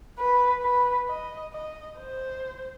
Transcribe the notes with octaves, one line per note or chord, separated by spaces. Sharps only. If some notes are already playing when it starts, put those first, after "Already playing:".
B4
B4
D#5
D#5
C5